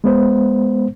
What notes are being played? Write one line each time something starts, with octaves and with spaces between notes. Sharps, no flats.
G#3 B3 C5